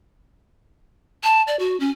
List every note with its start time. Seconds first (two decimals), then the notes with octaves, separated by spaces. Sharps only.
1.24 A5
1.48 D5
1.59 F#4
1.80 C#4